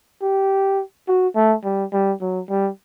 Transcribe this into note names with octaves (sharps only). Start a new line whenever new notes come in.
G4
F#4
A3
G3
G3
F#3
G3